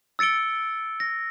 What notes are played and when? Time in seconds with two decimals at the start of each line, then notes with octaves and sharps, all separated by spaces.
0.19 E6 A6 C#7 D7 G7
1.00 A#6